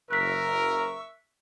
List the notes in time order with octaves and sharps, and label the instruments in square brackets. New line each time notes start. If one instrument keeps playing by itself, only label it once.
[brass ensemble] F#1 A#4 [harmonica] E5 C#6 E6 [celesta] F#6 B6